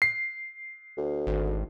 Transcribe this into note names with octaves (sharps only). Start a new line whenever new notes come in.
C7
D2
G#1